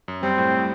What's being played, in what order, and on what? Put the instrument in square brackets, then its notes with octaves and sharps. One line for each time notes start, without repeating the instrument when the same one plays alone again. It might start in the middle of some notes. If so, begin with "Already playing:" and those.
[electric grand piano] F#2
[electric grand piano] G3 [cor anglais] C4
[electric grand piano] A2
A2